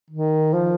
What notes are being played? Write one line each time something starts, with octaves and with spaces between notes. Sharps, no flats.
D#3
F3